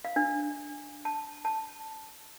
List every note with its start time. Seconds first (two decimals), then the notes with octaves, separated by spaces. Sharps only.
0.05 F5
0.16 D4
1.05 A5
1.45 A5